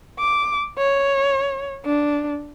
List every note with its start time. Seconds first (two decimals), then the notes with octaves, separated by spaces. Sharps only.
0.19 D6
0.78 C#5
1.86 D4